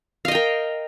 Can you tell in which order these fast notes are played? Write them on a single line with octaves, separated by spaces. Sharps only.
F5 D#5 G5 A#4